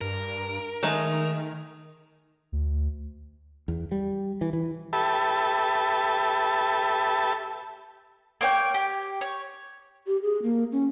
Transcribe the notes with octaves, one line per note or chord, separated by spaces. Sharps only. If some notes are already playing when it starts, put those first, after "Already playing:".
G2 A#4
D#3 G#3 A3 D#4
D2
E2
G3
E3
E3
G4 A4 B4 E5 A5
A#3 C#5 G5
G4
C#5
G4
G#4
A#3
C#4